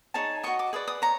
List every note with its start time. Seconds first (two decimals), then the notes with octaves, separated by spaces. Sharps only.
0.14 D#4 G#4 C#5 A5
0.43 F#4 A#4 D#5 C#6
0.59 D6
0.73 G#4 B4 D5 D#6
0.88 D#6
1.02 C#5 A#5